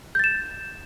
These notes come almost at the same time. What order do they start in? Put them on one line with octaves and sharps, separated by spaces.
G6 A6 E7